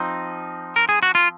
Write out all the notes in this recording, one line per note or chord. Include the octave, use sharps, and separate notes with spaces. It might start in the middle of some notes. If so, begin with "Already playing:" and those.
Already playing: F3 C4 D#4
A#4
G#4
F#4
F4